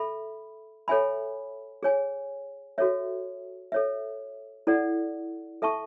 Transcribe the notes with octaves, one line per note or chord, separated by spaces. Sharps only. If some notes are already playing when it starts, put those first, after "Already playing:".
Already playing: A4 E5 B5
A4 C#5 E5 G#5 B5
G#4 C#5 G#5
F#4 A4 C#5 E5
A4 C#5 E5
E4 A4 D5 F#5
A4 E5 A5 C#6